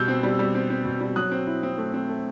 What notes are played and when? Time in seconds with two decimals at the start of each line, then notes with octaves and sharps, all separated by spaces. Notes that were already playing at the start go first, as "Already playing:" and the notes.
Already playing: B2 G3 E6 G6
0.08 C4
0.23 G3
0.39 G3
0.55 C4
0.70 C4
0.85 B2
1.01 G3
1.16 F#3 D#6 F#6
1.32 C4
1.47 E4
1.63 C4
1.78 A3
1.94 C4
2.09 A3